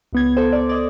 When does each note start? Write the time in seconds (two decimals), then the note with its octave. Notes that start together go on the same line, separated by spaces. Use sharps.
0.13 C#2 B3 G#6
0.37 A4 C5
0.53 D5
0.69 D5 D#5